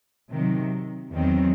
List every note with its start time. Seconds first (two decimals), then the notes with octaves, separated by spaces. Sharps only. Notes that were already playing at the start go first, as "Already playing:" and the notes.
0.32 C3 D#3 F#3
1.13 E2 D#3 F#3 C4